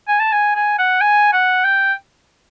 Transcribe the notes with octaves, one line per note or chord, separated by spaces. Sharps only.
G#5
A5
G#5
G#5
F#5
G#5
F#5
G5